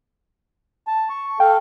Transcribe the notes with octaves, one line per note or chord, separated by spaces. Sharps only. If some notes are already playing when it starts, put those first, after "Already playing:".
A5
C#6
A4 F5 G5